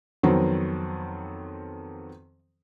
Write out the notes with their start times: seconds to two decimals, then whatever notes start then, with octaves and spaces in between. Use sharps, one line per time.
0.23 F2 D#3 F#3 B3 C4